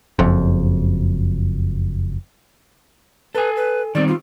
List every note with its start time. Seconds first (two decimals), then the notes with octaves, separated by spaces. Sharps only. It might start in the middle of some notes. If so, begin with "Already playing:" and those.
0.19 F#1 F2
3.35 A4 B4 G#5
3.57 B4
3.95 D#3 G3 C4 D5
4.08 F4